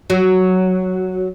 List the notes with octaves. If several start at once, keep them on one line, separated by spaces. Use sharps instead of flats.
F#3